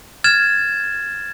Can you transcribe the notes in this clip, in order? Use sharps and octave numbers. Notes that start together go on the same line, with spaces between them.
F6 G#6 A6 E7